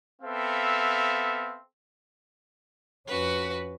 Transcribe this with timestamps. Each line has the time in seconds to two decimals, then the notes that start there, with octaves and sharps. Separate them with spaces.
0.22 B3 C4 A4 E5 F5
3.07 F2 C#4 F#4 B4